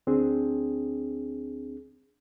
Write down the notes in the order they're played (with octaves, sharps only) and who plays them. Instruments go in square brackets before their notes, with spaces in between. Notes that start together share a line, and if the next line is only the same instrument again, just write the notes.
[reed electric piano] D2 C4 D4 G#4